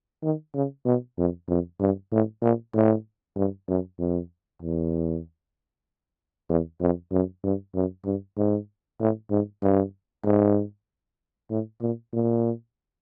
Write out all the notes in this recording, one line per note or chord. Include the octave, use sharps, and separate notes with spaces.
D#3
C#3
B2
F2
F2
G2
A2
A#2
A2
G2
F#2
F2
E2
E2
F2
F#2
G2
F#2
G2
G#2
A2
G#2
G2
G#2
A2
A#2
A#2